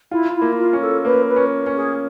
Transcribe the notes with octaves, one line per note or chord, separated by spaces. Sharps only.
E4 F4
E4
A#3
F4
C#4
A4
A#3 B4
B4
C#4
C#4
G#4